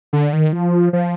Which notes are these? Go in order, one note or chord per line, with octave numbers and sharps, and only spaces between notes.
D3
D#3
F3
F3